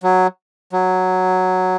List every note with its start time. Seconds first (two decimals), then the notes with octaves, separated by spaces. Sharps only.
0.03 F#3
0.73 F#3